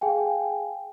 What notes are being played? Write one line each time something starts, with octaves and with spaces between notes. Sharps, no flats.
G#4 F5 G5 G#5